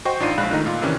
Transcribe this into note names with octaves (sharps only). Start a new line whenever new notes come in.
F#4 C5 D#5 G5 C#6
A1 D4 D#4 F4 C7 D#7
A#1 G#3 F5 B5 F#6
D3 D#3 A3 D#4
A#2 F4
C3 D#3 E3 C#4 D4